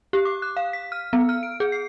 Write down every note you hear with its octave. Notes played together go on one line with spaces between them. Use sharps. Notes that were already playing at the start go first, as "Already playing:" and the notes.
G4
D6
F#6
F5
B6
F6
B3
F6
D7
G#4
C7